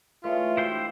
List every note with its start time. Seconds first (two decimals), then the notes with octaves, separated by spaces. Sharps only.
0.24 E3 G#3 A3 F4 B4 C#5
0.57 E4 F#4 C5 G5
0.71 D4 F5